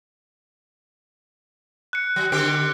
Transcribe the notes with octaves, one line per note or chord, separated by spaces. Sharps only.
F#6 C#7
F#3
D3 C4 G4